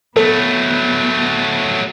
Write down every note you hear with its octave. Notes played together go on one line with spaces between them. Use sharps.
F#3 A3 B3 A4